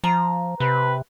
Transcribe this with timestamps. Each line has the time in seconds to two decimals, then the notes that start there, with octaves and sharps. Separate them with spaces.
0.04 F3 A#5
0.60 C3 B4